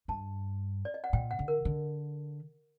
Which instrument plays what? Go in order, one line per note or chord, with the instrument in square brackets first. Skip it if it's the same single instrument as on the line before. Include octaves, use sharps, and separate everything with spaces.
[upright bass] G2 [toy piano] A5
[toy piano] D5
D#5
F#5
[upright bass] A#2 [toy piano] G5
[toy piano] F#5
[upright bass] D3
[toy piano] A#4
[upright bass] D3